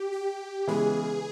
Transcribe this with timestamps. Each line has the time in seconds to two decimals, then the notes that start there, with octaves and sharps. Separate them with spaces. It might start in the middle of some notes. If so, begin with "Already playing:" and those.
Already playing: G4
0.13 G4
0.67 C#3 E3 G#3 B3 G#4